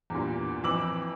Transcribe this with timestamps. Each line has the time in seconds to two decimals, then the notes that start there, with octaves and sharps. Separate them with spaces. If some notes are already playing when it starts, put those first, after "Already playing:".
0.10 E2 G2 A#2
0.63 F2 E3 D6 E6 F#7